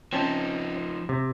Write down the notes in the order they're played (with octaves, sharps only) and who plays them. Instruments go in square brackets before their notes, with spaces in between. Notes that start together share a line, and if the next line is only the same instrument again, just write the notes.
[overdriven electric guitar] F3 D#4 [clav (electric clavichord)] C4 C#4 A5
[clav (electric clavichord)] C3